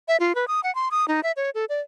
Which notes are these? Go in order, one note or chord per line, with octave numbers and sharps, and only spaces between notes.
E5
F4
B4
D#6
F#5
C6
D#6
D#4
E5
C#5
A4
D5